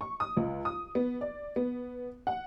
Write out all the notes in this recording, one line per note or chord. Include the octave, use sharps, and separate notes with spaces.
C#6
D#6
C#2
D#6
B3
D5
B3
F#5